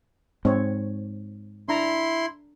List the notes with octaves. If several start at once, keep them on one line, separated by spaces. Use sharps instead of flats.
G#2 C4 C#5
D4 E4 A#5 C6